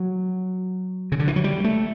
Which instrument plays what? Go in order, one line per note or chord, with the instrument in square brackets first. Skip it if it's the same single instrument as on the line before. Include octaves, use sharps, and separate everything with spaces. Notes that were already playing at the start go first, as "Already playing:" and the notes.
Already playing: [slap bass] F#3
C#3
D3
E3
F#3
G3
A3